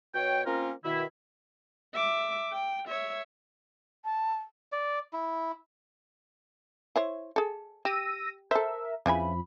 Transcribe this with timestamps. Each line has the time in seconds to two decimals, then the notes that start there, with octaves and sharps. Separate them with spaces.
0.14 B2 C#5 G5
0.46 A#3 C4 C#4 F4 A#4
0.84 B2 D#3 E4
1.94 E5 D6
2.52 G5
2.88 C#5 E5
4.05 A5
4.72 D5
5.13 E4
6.96 E4 C5 C#5
7.36 G#4 A4
7.85 G4 E6 A#6 D#7
8.51 A4 A#4 C5 E5
9.06 F2 C#3 E3 F3 G#5 B5